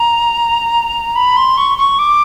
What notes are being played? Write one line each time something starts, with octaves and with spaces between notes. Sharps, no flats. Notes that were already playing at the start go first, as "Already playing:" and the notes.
Already playing: A#5
B5
C6
C#6
C#6
D6